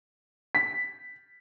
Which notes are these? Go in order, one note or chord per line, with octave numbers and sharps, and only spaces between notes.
B6